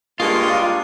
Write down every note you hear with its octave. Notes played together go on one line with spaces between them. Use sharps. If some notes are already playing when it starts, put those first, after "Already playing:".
G2 G#3 A#3 F4 C#6 D#6